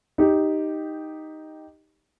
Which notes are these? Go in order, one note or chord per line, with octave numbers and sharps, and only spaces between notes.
D#4 G4